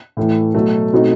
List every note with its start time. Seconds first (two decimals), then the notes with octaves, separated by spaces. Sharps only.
0.17 A2 E3 A3 E4
0.55 B2 F#3 A3
0.93 B2 A3 C4 D#4